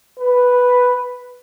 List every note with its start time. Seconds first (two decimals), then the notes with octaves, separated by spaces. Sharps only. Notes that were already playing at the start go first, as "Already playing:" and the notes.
0.19 B4